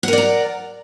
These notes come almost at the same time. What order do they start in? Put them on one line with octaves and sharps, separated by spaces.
F#5 A#4 D5 A#5